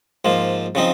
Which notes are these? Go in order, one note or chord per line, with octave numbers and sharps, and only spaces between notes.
G#2 F3 A#3
C#3 F3 C4 D#4